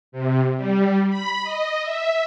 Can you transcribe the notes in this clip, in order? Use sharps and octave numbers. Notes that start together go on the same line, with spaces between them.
C3
G3
B5
D#5
E5